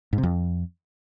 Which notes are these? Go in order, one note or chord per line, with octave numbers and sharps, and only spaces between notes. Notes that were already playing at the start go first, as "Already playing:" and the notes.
G#2
C3
F2